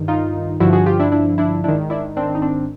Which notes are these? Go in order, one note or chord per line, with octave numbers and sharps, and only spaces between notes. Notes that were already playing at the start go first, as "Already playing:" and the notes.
Already playing: G2 D#3
D#4 F4
G2 D3 F3 E4 F#4
F#4 G#4
F4 G4
D4 E4
D4 E4
D4 E4
G#2 D#3 D4 E4
D4 E4
C4 D4
D#4
C4 D4